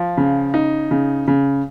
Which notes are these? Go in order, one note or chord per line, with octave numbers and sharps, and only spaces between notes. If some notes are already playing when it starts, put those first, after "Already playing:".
Already playing: F3
C#3
D#4
C#3
C#3